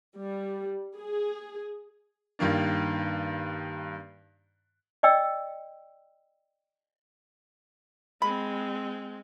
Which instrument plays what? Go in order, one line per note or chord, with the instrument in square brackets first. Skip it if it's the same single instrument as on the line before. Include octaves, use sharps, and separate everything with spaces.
[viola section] G3
G#4
[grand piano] G2 D#3 A#3 D4
[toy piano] D5 D#5 G5 E6
[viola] G#3 C4 [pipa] B5